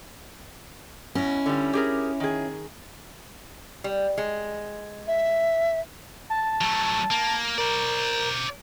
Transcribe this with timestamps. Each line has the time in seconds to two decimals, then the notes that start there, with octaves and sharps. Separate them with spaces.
1.15 B2 C#4 E4
1.46 D3 G3
1.73 G4 G#4 A#4
2.20 D#3 G#4
3.84 G3
4.18 G#3
5.07 E5
6.30 A5
6.61 F#3 A3
7.11 A#3
7.58 A#4 C5 D5